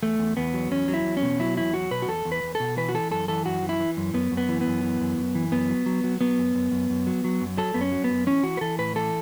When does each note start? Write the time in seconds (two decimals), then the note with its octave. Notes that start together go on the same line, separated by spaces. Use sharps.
0.02 E2 A3
0.19 E2
0.37 E2 B3
0.54 F#3
0.71 E2 C#4
0.88 F#3
0.94 E4
1.05 E2
1.17 C#4
1.22 B2
1.39 F#3 E4
1.57 E2 E4
1.74 F#3 F#4
1.91 B2 B4
2.02 F#4
2.08 E2 A4
2.25 E2
2.32 B4
2.43 E2
2.55 B2 A4
2.77 E3 B4
2.89 F#4
2.94 E3 A4
3.11 F#2 A4
3.28 E3 A4
3.46 F#2 F#4
3.63 E3
3.69 E4
3.80 E3
3.97 F#2
4.14 F#2 B3
4.31 F#2
4.37 B3
4.49 E3
4.61 B3
4.66 F#2
4.83 E3
5.01 F#2
5.17 F#2
5.35 E3
5.52 F#2 B3
5.70 F#3
5.86 F#3
6.04 F#3
6.21 F#3 B3
6.38 F#2
6.55 F#2
6.72 F#2
6.90 F#2
7.07 F#3
7.24 F#3
7.41 F#2
7.58 F#3 A4
7.74 F#2 B3
7.81 C#4
7.92 F#3
8.04 B3
8.10 F#2
8.27 E3 C#4
8.43 E3 F#4
8.57 B4
8.61 E3 A4
8.78 A2 B4
8.95 E3 A4